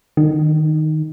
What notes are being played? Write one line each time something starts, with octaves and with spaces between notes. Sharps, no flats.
D#3